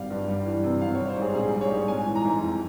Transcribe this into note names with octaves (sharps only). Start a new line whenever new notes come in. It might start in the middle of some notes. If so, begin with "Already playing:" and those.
Already playing: G#1 G3 F5
G2
G3
E3
C3
G#1 F5
G3 C#5
C5
G#2 G#4
A#1 G#4
G3
C#5
G#2
G#3 G#5
E3
A#5
G#2
F2